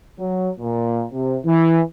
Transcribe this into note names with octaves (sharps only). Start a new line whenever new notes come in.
F#3
A#2
C3
E3